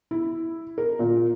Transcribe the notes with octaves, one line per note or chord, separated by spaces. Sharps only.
E4
A#4
A#2